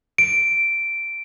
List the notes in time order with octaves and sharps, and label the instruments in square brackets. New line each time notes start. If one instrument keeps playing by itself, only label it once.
[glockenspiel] D7